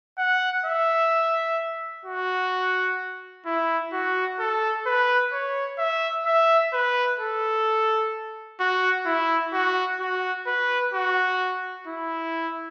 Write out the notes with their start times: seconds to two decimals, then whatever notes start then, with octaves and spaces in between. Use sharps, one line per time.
0.18 F#5
0.66 E5
2.05 F#4
3.46 E4
3.93 F#4
4.40 A4
4.86 B4
5.33 C#5
5.79 E5
6.26 E5
6.73 B4
7.20 A4
8.60 F#4
9.06 E4
9.53 F#4
10.01 F#4
10.47 B4
10.94 F#4
11.87 E4